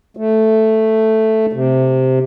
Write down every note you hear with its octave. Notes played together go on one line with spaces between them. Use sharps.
A3
C3